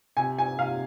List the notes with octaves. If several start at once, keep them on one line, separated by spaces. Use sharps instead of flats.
C3 G#5
G#5
C3 F5